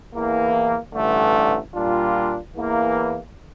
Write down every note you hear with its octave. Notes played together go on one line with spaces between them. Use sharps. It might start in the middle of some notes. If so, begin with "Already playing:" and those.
E2 E3 A#3
A1 G2 D3 A3
A#2 G3 D4 F4
E2 E3 A#3